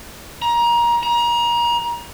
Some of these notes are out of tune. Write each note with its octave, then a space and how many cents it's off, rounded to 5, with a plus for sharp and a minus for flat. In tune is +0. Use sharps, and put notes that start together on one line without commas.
A#5 +25
A#5 +30